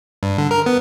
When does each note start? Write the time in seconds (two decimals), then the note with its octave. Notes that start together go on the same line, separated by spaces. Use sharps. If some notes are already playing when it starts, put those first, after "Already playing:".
0.23 G2
0.38 D3
0.51 A#4
0.66 B3